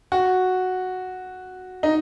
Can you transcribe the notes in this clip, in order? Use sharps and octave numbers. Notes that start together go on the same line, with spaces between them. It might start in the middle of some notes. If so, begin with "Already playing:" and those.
F#4
D#4